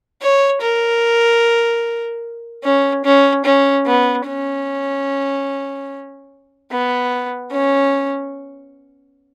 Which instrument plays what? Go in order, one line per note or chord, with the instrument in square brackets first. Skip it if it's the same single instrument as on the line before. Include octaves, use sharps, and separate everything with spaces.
[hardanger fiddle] C#5
A#4
C#4
C#4
C#4
B3
C#4
B3
C#4